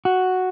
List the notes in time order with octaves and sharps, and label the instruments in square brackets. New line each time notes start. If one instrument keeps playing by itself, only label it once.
[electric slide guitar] F#4